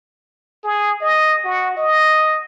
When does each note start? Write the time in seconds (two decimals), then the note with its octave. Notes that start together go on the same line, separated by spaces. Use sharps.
0.64 G#4
1.01 D#5
1.45 F#4
1.77 D#5